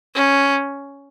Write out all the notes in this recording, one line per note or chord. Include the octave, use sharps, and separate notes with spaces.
C#4